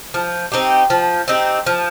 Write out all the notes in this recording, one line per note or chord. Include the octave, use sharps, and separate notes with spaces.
F3
C4 D#4 G4
F3
C4 D#4 G4
F3